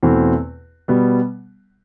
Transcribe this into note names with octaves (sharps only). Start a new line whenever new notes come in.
E2 B2 A3 C4 E4
B2 G3 B3